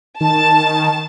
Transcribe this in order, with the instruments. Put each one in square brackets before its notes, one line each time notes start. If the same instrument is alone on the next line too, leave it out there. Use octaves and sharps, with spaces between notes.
[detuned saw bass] D#3 [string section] A5